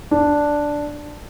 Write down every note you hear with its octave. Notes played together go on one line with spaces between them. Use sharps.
D4